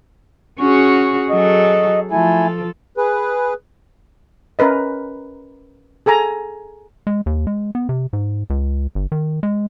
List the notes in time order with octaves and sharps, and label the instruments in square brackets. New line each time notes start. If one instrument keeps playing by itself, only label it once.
[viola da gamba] C#4 F#4 G#4 [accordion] C#6
[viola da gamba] F#3 G#4 A4 [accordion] D#5
[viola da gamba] F3 A4 [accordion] A3 E4 G#5
[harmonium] G#4 B4
[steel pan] C#4 A#4 B4 D#5
G#4 A4 G#5 A#5
[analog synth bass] G#3
D#2
G#3
B3
C3
G#2
C#2
G1
D#3
G#3